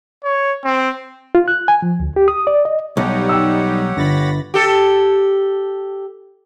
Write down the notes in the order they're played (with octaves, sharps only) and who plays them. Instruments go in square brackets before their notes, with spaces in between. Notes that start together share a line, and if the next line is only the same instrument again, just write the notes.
[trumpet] C#5
C4
[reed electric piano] F4
F#6
G#5
F3
D2
G4
D#6
D5
D#5
[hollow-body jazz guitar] B1 [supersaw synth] G3 D#4 [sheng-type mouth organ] G4 C#5 F#5
[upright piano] G5 E6
[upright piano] G1 [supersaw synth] B5 A6 A#6
[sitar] G4 A4